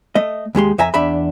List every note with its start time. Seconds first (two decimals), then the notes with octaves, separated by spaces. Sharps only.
0.15 A3 D#5
0.55 D#2 G#3 G4 C6
0.78 F2 E5 G#5 A#5
0.94 E2 D4 E5 B5